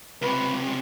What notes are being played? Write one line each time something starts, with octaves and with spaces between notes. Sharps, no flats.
C#2 C3 B4